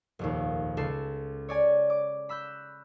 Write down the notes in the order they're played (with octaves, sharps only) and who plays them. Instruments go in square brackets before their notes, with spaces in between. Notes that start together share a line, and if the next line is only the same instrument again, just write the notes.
[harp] F1 A#1 D#2
C#2 A4 C7 E7
C#5 D5 G#5
D6
B5 E6 F#6 G6